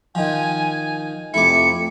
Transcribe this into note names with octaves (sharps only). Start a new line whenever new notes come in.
D#3 F3 G#5
F2 C3 A3 E4 D6 C#7